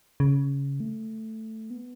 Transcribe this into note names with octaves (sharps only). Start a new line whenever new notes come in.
C#3
A3
B3